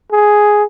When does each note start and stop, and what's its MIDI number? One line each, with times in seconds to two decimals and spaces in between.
0.12 0.64 68